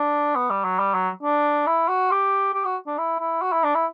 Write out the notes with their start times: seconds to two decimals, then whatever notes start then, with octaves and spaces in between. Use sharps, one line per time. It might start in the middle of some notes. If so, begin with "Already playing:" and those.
Already playing: D4
0.36 B3
0.50 G3
0.64 F#3
0.79 G3
0.94 F#3
1.23 D4
1.67 E4
1.89 F#4
2.11 G4
2.54 G4
2.65 F#4
2.87 D4
2.98 E4
3.20 E4
3.42 F#4
3.52 E4
3.64 D4
3.75 E4